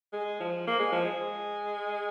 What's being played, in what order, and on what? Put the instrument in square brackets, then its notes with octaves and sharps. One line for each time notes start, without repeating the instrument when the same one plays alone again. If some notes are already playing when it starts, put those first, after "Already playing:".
[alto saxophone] G#3
F3
A#3
G#3
F3
G#3